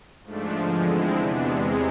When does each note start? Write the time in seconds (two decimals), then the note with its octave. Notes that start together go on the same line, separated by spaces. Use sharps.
0.24 G#2 F3 A3 D4
0.55 E2 D3 F3 G#3
0.85 D3 G#3 C4 E4
1.16 E2 C3 E3 B3 D4
1.47 E2 C3 G#3